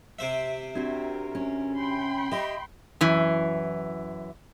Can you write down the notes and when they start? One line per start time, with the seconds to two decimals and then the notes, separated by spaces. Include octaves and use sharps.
0.19 C3 C5 E5
0.75 C4 D4 F#4 G4 A#4
1.35 C#4
1.77 G5 B5 C6
2.32 G4 D#5 E5
3.01 F#2 E3